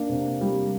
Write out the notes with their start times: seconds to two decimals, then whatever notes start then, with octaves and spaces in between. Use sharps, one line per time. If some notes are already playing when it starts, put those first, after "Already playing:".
Already playing: A#3 D4
0.09 C3
0.41 G3